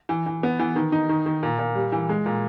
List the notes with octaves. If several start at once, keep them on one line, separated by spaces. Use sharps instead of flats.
E3
E3
B3
E3
D#3
D#4
D#3
D#3
A#2
A#2
G3
E3
G#3
A#2